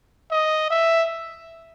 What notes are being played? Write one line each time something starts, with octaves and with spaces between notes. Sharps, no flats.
D#5
E5